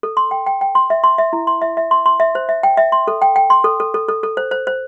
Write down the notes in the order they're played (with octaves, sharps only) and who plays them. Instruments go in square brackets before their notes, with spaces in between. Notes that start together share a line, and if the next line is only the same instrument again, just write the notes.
[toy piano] A4
C6
G5
G5
G5
C6
E5
C6
E5
E4
C6
E5
E5
C6
C6
E5
C5
E5
G5
E5
C6
A4
G5
G5
C6
A4
A4
A4
A4
A4
C5
C5
C5